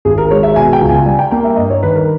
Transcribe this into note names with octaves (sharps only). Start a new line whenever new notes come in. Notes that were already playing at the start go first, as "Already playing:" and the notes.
G#1 G#4
A#4
G#3 C#5
E5
B2 G#5
G5
C#2
G#5
G3 G#5
G5
A#3 G5
E5
G2 D#5
C#5
D#3 B4
A#4